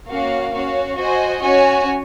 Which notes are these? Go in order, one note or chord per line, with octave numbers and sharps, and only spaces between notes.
A#3 C#4 F#4 C#5 F5
C#4 F#4 C#5 F5
F#4 C5 D#5 G#5
C#4 F#4 C#5 G#5